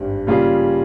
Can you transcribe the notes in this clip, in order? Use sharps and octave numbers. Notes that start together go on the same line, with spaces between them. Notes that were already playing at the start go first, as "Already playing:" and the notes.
Already playing: G#1 G2 G3
C#3 G3 A#3 F4 G#4